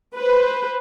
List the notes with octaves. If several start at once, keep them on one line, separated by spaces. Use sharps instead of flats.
B4 C5